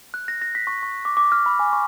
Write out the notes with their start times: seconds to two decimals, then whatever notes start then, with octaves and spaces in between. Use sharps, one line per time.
0.14 F#6
0.28 A#6
0.41 A#6
0.55 B6
0.67 C#6
0.83 C#6
1.05 D6
1.17 D6
1.32 F6
1.46 B5
1.59 G#5
1.73 C#6